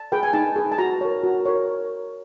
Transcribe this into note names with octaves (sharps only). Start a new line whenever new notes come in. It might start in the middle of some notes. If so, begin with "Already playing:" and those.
Already playing: A5
G#4 B4 G5
G#5
D#4 A5
G#4 B4
A5
F#4 A#5
A#4 C#5
F#4
A#4 C#5